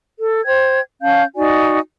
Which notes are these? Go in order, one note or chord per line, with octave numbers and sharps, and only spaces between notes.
A4
C5 G5 G#6
C#4 F5 A5 G6
D#4 F#4 D5 G#5